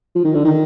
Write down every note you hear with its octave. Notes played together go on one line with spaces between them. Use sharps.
F3
D#3
D3
D#3